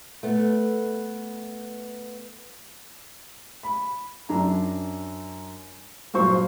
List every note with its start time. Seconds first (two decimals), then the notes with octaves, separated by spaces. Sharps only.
0.23 A3 B3
3.63 B5
4.29 F#2 D4 A#5
6.14 G2 A#2 F#3 C5 C#6